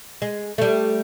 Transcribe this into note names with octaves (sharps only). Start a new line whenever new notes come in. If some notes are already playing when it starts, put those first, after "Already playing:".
G#3
G3 A3